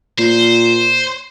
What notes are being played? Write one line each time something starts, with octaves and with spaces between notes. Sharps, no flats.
A#2 C5